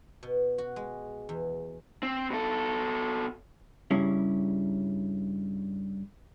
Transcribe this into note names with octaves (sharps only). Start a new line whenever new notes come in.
B2
F#4
G#3
E2
C4
B2 A4
G2 C#3 G3 C#4 E4